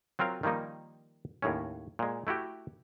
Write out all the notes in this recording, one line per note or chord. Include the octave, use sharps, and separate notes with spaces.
F#3 C4 F4 A#4 F5
D#3 F3 G3 A#3 D#4
D#2 A2 C#4
A#2 G#3
A3 E4 F#4 G4